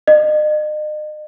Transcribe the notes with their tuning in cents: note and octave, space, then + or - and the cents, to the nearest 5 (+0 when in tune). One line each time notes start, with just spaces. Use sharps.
D#5 -40